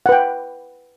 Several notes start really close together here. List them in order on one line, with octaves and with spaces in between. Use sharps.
F#5 B4 G5